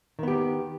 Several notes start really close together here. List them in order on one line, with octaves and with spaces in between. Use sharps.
D#3 B3 G4